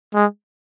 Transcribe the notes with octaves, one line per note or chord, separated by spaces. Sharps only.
G#3